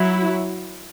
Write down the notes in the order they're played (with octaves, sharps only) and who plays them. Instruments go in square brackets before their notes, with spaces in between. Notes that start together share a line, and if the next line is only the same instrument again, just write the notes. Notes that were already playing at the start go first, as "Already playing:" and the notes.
Already playing: [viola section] F#3 E4